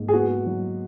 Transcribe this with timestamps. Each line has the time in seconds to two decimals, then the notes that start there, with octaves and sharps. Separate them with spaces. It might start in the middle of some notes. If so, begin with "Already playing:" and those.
Already playing: G#2 A#3
0.08 G#4
0.13 B3 F#4
0.46 F#3